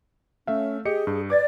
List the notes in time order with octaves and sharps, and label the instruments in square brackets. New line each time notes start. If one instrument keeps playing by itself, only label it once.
[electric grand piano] A3 E5 F5 [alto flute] C#4
[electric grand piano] G4 D#5 C#7 [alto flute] G#4
[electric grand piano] G2
[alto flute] B4 [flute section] D5 [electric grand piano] D6 G#6 A6